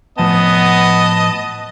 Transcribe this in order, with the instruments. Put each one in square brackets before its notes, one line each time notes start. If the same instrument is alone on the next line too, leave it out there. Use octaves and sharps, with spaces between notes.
[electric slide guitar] A2 F3 G#5 [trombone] B3 [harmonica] D#5 A5